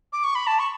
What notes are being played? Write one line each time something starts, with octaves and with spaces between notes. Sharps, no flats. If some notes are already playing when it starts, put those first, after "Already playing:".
D6
C#6
B5
A5
C#6